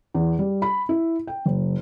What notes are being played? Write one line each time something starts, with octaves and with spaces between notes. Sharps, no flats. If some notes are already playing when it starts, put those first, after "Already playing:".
E2
G3
B5
E4
G5
F#1